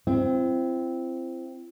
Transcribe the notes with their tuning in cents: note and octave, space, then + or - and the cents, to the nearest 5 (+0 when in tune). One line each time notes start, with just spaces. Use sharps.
C4 +0 E4 +45